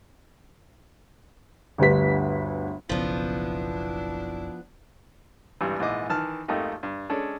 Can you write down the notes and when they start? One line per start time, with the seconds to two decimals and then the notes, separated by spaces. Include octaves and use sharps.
1.78 G1 D2 G3 B4 B6
2.89 F#1 B1 C#3 F3 B3 D4 E4
5.61 G#1 G2 E3 G3
5.79 A#1 G#2 E3 E4 D#5 D6
6.09 D#3 E3 A5 F6
6.48 G#1 F2 A3 A#3 D#4 G4
6.83 G2
7.09 G#3 C#4 D4 A4